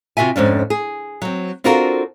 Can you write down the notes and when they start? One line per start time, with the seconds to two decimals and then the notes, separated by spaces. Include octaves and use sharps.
0.17 C3 F4 F#4 E5 G#5
0.36 F2 G#2 C#4 D4
0.70 G#4
1.22 F#3 C4
1.64 C4 D4 F4 F#4 A4 A#4